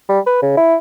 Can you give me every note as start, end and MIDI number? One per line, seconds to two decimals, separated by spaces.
0.09 0.20 55
0.27 0.42 71
0.42 0.55 49
0.57 0.76 64